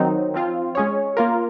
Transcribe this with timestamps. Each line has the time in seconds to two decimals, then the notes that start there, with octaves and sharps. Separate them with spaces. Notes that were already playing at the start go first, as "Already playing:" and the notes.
Already playing: D#3 F#3 C4 D#4
0.34 F3 C4 F4
0.75 G#3 C#4 G#4 C#5
1.17 A#3 F4 A#4